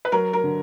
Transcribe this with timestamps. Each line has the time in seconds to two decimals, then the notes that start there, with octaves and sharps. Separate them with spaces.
0.05 B4
0.12 F#3 A#4
0.33 A#4
0.44 D3